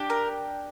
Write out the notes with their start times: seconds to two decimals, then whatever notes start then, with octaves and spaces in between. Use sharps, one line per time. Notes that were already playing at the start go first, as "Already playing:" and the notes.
Already playing: D4 G4
0.10 A#4